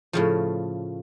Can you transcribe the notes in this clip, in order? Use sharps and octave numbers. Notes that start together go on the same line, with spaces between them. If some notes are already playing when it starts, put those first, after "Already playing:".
A2 C#3 F3